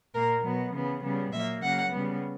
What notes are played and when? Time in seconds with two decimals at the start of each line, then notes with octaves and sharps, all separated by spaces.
0.14 A#2 A#3 A#4
0.44 B2 F#3 B3
0.73 C#3 E3 B3
1.03 C#3 G3 B3
1.32 A#2 F#3 A#3 E5
1.62 C#3 F#3 A#3 F#5
1.92 C#3 G3 B3